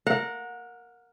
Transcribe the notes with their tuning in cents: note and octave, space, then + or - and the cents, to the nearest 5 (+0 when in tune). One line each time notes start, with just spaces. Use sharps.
A#4 +0 F#5 -30